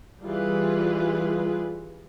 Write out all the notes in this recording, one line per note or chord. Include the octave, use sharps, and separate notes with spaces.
E3 G3 F4 G#4 B4